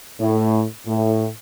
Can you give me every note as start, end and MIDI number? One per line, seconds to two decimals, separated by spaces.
0.21 0.63 45
0.87 1.27 45